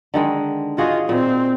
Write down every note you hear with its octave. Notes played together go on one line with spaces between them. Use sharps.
D3 D#3 G#3
F4 F#4 G#4 D#5
A#2 C4